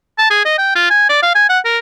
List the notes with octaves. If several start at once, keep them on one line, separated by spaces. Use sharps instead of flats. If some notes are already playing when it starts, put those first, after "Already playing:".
A5
G#4
D#5
G5
F4
G#5
D5
F5
G#5
F#5
A#4